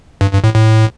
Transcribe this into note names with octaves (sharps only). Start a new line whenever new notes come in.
G2
G2
A2
A2